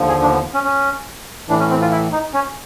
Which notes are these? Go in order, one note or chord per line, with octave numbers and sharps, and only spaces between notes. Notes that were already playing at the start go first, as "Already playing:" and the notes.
Already playing: D#2 D3 F3
G#4
D4
B3
C#4
C#4
A2 E3 D4
C#4
C4
F4
E4
D#4
C#4